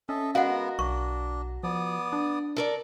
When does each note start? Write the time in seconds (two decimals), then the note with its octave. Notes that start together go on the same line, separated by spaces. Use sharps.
0.09 C#4 A4 D#5 E5
0.35 G#3 B3 F#4 A#4 F5 F#5
0.79 B1 D4 C#6
1.63 F3 B3 D5 D#6
2.13 D4
2.57 A4 A#4 D5